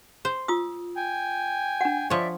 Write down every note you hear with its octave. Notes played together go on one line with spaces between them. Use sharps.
C5
F4 D#6 E6
G5 G#5
D4 F#5
F3 C#5 D5 E5